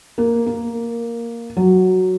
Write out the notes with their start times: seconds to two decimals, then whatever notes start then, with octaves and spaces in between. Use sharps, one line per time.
0.18 A#3
0.46 A#3
1.57 F#3